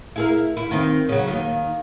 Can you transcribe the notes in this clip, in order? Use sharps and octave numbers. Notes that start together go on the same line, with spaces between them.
E4 G#4 A#4
E4
D#3 C4
C#3 F#3
D#2 D#3